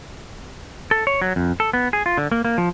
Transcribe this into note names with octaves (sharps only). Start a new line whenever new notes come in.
A4
C#5
F#3
F2
A4
B3
G#4
F4
D3
A#3
A#3
F3